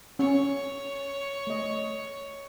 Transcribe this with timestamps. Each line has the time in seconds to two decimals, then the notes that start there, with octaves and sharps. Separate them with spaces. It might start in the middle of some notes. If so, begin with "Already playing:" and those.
0.19 C#4 C#5
1.47 A3 D#5